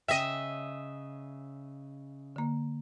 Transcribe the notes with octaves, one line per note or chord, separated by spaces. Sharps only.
C#3 D#5 E5 G5
D3 A#3